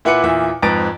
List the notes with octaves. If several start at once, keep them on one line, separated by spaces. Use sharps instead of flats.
A#2 E4 B4 F#5 D6 C#7
E2 A#2 E5
F2 G#2 B4 A#5 A6 D7